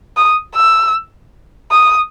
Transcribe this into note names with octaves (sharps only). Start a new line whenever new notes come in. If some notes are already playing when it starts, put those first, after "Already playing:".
D#6
E6
D#6